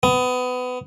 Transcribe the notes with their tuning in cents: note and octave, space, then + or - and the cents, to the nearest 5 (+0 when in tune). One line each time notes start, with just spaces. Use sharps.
B3 +25